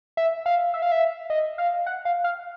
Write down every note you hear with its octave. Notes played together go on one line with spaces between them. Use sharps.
E5
F5
E5
F5
E5
D#5
F5
F#5
F5
F5